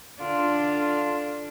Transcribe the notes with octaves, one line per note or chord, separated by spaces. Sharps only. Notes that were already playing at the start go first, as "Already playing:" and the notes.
D3 D4 F4